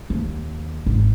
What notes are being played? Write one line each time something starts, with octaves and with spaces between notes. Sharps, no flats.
D#2
G#1